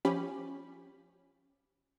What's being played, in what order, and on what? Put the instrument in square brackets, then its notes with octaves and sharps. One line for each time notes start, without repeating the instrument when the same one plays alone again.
[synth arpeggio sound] F3 C#4 G4 B5